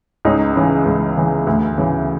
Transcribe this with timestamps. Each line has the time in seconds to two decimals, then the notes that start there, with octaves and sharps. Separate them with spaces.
0.25 C#2 C#4 D#4
0.56 C#3 E3
0.85 C#2
1.17 C#3 E3
1.47 D2
1.78 C#3 E3